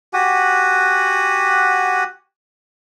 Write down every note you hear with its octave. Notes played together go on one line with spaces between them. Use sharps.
F#4 G4 F#5 G#5